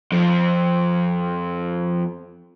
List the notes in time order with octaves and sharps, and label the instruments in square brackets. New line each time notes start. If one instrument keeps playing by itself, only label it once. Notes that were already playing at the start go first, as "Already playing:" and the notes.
[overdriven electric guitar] F2 F3